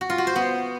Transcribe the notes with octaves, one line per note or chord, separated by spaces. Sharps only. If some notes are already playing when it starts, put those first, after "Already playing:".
F#4
F4
F#4
C5
B3